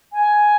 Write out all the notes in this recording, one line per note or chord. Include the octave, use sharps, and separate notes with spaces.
G#5